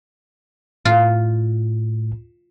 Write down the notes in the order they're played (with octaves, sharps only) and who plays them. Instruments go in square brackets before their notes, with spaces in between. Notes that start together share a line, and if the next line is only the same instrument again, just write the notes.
[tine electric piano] A2 [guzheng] F4